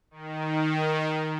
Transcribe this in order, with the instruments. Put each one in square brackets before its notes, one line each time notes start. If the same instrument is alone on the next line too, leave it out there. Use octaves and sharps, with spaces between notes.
[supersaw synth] D#3